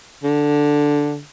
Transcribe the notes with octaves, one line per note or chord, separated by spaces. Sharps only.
D3